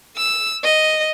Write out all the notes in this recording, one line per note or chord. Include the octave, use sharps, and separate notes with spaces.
E6
D#5